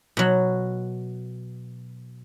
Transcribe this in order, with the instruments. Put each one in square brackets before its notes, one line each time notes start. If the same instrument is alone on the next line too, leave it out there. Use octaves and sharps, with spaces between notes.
[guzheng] B2 F#3